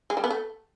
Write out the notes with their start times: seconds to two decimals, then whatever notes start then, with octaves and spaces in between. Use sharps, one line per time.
0.10 G#3
0.17 G3
0.24 B3
0.30 A3